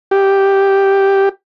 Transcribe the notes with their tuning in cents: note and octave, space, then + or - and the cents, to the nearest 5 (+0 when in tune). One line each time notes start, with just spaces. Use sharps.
G4 +0